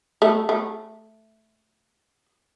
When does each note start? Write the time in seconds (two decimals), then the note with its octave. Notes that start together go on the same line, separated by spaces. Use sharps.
0.22 A3
0.49 A3